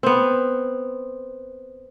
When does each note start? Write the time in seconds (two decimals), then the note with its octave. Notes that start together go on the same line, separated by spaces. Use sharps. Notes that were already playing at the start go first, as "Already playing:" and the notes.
0.03 B3 C4